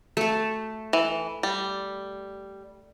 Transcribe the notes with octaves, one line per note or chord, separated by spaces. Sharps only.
A3 A4
E3
G3